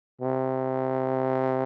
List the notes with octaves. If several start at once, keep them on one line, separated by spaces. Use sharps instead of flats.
C3